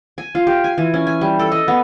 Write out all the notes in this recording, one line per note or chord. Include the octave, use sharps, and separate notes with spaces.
G#5
F4
G4
G#5
E3
C#4
G#5
G3
A4
D#5
B3